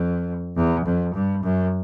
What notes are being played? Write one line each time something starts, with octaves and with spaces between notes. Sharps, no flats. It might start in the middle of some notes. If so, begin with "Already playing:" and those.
Already playing: F2
E2
F2
G2
F#2